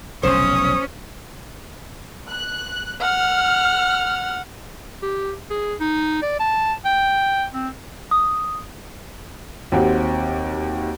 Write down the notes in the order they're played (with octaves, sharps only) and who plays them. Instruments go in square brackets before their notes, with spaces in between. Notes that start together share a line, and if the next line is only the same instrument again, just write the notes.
[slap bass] F1 B1 C#3 [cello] C#4 [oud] C5 [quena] D#6
[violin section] F#6
[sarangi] F#5 [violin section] F6
[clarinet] G4
G#4
D#4
D5
A5
G5
C4
[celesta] D#6
[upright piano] D#2 C4 F#4 G4